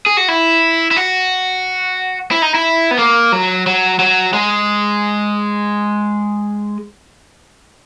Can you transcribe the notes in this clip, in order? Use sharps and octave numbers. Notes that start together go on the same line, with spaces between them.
G#4
F#4
E4
E4
F#4
E4
D#4
E4
B3
A#3
F#3
F#3
F#3
G#3